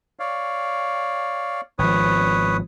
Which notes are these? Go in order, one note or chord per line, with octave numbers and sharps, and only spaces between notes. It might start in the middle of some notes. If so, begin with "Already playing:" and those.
C#5 D5 F5
G#1 F3 B4 C#5 D#6